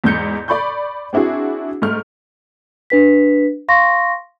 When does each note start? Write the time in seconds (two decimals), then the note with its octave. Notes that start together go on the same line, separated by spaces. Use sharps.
0.04 E2 G#2 G6 C#7
0.48 D5 B5 C#6 G6
1.13 C4 D4 E4 F#4 G#4
1.82 G#2 A3 F6
2.90 D4 B4 B6
3.68 F5 C6 C#6 A#6